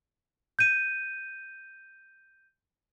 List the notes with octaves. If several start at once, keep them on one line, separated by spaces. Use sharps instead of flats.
G6 D#7